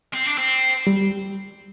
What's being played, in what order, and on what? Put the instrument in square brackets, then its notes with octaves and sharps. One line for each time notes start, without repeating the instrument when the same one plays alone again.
[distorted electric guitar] C4
D4
C4
[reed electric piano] G3